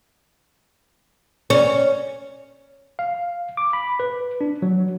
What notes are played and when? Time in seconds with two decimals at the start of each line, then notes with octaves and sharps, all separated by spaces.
1.50 C#4
2.99 F5
3.57 D6
3.73 B5
4.00 B4
4.41 D4
4.62 F#3